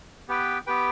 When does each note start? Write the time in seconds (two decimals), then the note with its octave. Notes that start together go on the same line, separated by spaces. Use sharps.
0.29 B3 G4 B4 G5
0.67 B3 G4 B4 G5